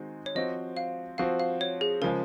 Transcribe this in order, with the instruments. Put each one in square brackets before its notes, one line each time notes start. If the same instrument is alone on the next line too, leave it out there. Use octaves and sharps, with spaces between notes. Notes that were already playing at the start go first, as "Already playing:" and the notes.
Already playing: [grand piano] D#3 G#3 C4 D#4 F#4
[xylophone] C#5
[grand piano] F3 C4 F#4 [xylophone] D#5
[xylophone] F5
[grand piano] F3 C4 F#4 [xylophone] F5
[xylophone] F5
C#5
G#4
[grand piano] C#3 F3 G#3 [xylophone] A#4